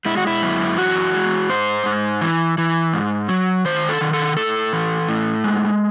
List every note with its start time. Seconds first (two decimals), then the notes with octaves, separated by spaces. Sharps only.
0.05 G#3 E4
0.17 F#4
0.27 E4
0.42 F#2
0.77 E3 F#4
1.14 G#3
1.49 G#2 C5
1.86 G#2
2.21 E3
2.58 E3
2.94 G#2
3.29 F#3
3.65 D#3 C5
3.89 A4
4.01 D#3
4.13 A4
4.37 A2 A4
4.73 E3
5.09 A2
5.44 G#3